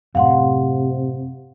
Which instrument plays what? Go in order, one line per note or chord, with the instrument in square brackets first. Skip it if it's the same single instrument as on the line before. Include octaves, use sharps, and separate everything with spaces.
[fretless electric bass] F#2 A2 [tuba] C3 [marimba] F5 F#5 C6